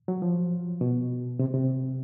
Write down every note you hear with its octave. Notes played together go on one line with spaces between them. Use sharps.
F#3
F3
B2
C3
C3